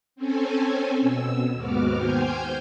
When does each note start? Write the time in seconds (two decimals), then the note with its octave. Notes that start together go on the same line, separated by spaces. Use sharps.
0.16 C4 C#4 A4 G#5
1.00 B2 E6
1.54 D#2 G#2 B3 F#4 D6 F6
1.97 C5 G5 G#5 F6 G6 G#6